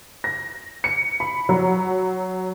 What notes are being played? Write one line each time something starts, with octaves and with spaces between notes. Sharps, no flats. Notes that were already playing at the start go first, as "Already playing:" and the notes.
A#6
C#7
B5
F#3